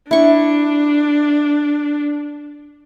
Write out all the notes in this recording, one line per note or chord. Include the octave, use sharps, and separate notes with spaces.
D4 E4 C#6